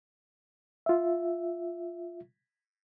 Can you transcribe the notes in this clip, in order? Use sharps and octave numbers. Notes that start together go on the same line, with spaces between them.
F4 E5